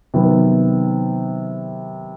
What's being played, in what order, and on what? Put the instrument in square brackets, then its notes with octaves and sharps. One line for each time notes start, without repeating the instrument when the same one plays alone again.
[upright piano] C3 D#3 F#3 B3